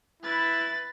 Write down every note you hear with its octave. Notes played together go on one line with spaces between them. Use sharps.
E4 B4 A6